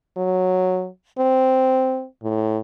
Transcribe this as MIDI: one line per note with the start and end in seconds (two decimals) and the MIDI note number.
0.17 0.88 54
1.19 2.06 60
2.23 2.59 45